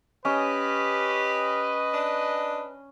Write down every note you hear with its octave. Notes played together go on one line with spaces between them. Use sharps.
C#4 G4 B4 D#5
D4